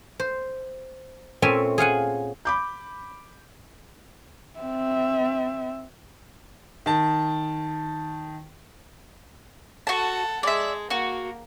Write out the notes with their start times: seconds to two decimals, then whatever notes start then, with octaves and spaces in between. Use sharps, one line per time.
0.20 C5
1.42 A#2 A3 C4 C#4 E5 G#5
1.78 G#4 F5 F#5 G#5
2.45 B5 D6 G6
4.60 C4 E5
6.86 D#3 A5
9.87 F#4 A4 F#5 A5
10.43 G#3 D5 E5
10.90 A#3 F#4